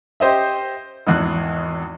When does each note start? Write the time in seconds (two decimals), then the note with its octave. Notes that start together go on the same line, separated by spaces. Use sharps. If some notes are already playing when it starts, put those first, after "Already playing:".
0.20 G4 C5 D#5 E5
1.06 G#1 E2 F#6